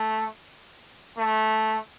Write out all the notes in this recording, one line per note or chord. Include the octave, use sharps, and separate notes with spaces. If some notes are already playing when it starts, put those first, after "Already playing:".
Already playing: A3
A3